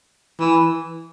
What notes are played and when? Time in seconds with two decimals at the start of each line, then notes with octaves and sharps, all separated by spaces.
0.40 E3